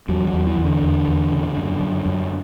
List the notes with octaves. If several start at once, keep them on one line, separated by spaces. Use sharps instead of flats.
E2 F#3
F#3
E2
E3
E2
D3
E2
E2
C#3
F#2
F#2
F#2